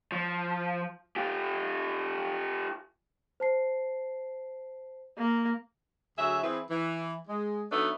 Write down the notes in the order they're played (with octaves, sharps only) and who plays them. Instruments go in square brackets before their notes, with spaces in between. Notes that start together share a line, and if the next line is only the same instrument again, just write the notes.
[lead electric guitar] F3
F4 G4
[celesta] C5 A5 C7
[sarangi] A#3
[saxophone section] D2 F#3 G#4 E5
E3 C4 E4 G#4 B4
E3
G#3
F#3 A3 B3 D4 D#4